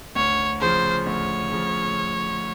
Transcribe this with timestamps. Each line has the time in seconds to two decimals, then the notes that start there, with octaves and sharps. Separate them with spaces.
0.16 D2 C#5
0.61 C#3 F3 C5
1.06 D2 C#5
1.51 C#3 F3